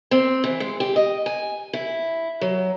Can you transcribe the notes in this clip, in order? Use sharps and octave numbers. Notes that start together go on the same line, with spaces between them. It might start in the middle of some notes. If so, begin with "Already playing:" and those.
C4
E3
G#3
G4
D#5
G#5
E4
F#3